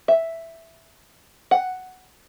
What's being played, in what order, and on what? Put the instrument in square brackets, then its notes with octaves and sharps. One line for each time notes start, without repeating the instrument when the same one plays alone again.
[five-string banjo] E5
F#5